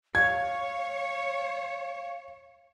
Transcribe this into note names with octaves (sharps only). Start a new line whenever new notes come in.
C#5 F5 G#6